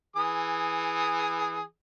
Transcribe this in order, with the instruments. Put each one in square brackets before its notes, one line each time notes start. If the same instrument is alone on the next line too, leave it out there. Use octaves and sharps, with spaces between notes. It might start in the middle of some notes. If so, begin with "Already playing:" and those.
[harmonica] E3 G#4 D#6